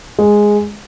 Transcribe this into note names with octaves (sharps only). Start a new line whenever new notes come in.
G#3